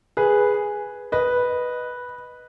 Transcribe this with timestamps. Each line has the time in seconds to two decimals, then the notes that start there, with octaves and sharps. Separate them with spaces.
0.17 G#4 B4
1.12 B4 D#5